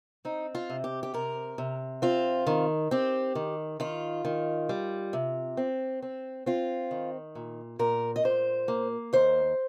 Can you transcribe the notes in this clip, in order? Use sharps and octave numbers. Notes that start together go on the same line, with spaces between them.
C4 D#4
F4
C3
G4
G4
C3 A#4
C3
C4 F4
D#3
C4 G4
D#3
D#3 F4
D#3
G3
C3
C4
C4
C4 F4
D#3
A#2
A#2 A#4
D#5
A#2 C5
A#3
D#2 C5